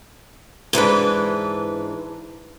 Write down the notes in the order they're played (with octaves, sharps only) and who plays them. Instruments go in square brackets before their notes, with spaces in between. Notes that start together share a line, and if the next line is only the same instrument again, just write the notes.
[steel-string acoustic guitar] G#2 E3 D4 B4